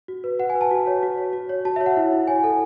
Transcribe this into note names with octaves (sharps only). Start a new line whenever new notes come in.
F#4
B4
F#4 F#5
G#5
B4
A5
F#4
C#5
F#4
C#5
F#4
C#5
F#4 A5
E5
C#5
F#5
E4
E4
C#5 G#5
A4